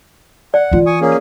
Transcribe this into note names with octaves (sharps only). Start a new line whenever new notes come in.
D5 F#5
E3 F4
G#5 C#6 D#6
A#3 C#4 G#4